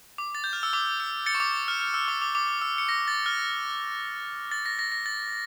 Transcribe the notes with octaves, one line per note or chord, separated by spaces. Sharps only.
D6
A6
G6
F6
E6
D6
E6
A6 C#7
C#6
D6
F6
F6
E6
D6
D6
D6
E6
C#7
A#6
A6
F6
A6
A#6
A#6
A#6
A6